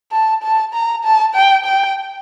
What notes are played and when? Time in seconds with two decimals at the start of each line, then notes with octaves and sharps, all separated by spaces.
0.12 A5
0.43 A5
0.74 A#5
1.04 A5
1.35 G5
1.65 G5